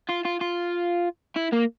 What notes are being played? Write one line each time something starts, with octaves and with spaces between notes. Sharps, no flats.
F4
F4
F4
E4
A#3